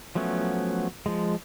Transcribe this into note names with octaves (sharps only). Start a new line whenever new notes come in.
F3 F#3 A3 B3 C#4
F3 G#3